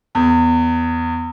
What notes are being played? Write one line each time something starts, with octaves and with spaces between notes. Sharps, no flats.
E2